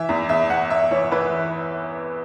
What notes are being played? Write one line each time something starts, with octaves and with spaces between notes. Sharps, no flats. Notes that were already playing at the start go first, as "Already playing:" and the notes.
Already playing: E3 E5
E2
E2 E5
E2 F#5
E2 E5
E3 C#5
E3 B4